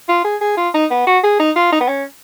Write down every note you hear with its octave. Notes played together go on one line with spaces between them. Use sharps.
F4
G#4
G#4
F4
D#4
B3
F#4
G#4
D#4
F4
D#4
B3
C#4